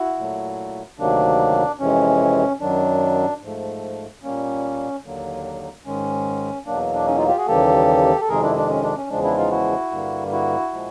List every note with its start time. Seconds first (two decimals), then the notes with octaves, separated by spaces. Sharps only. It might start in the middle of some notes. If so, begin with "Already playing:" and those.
Already playing: E4 F#4
0.18 A#2 F#3 A3
0.99 D2 C3 D#3 F#3 A#3 D4
1.80 F2 C3 E3 G#3 C#4
2.61 F#2 D#3 F#3 D4
3.42 G#2 F3 A3
4.23 A#2 G3 A#3 C#4
5.05 D#2 D3 F#3 A#3
5.86 G#2 D#3 G#3 C#4
6.66 E2 B2 F#3 A#3 D4
6.94 D4
7.07 C#4 D#4
7.18 D#4 F4
7.28 F4 G4
7.38 F#4 G#4
7.48 D#2 C#3 E3 G3 A#3 G4 A4
8.21 A4
8.29 F2 C3 D#3 G#3 G#4 A#4
8.42 D4 E4
8.56 D4
8.70 C#4
8.83 D4
8.97 C#4
9.10 E2 C#3 F3 G#3 D4
9.24 D4 E4
9.37 D#4 F4
9.51 E4 F#4
9.91 G2 D3 G3 A#3
10.32 E4 F#4
10.73 A#2 F3 G#3